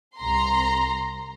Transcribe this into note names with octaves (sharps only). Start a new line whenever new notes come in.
C2 A#5 C6